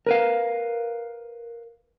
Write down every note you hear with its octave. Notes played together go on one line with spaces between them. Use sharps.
A#4 B4 F5